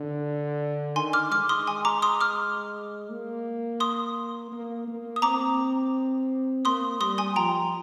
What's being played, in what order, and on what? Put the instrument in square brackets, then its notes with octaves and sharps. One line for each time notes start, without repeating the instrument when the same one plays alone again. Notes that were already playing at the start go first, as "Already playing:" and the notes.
Already playing: [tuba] D3
[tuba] D#3 [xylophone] G#5 C6
[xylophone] D6 F6
[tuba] G#3 [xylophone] D6 F6
[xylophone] C6 D#6
G#5 C6
A#5 D6
C6 D#6
D6 F6
[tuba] A#3
[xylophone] C6 D#6
[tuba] A#3
A#3
[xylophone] D#6
[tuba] C4 [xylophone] A#5 D6
[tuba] A#3 [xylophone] C6 D#6
[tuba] G3 [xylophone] C6 D#6
[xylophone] G#5 C6
[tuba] F3 [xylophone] G5 A#5